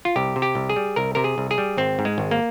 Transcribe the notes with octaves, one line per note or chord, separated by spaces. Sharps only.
F4
C2 G4
C3
G4
C2
G#4
G3
C2 A#4
C3 A#4
G#4
C2
G#4
G3
G#1 C4
G#2
G#3
G#1
A#3